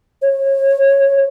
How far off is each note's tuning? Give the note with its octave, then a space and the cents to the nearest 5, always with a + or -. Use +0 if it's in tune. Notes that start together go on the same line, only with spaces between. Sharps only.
C#5 -25